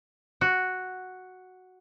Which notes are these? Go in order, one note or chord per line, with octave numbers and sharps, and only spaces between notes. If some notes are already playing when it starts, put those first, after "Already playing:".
F#4